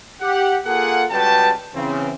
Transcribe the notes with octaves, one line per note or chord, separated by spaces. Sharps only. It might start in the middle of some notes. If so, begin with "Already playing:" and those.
G4 F#5
A#3 F4 G#4 A4 F#5
C#2 G3 F#4 B4 G5 A5
C#3 E3 C4